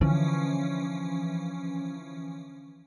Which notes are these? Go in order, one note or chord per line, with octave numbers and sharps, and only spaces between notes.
D3 E3 F3 C#4